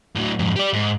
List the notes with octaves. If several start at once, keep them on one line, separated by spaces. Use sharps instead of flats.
A2 F#3
F2 G#2
G4 D5
G#2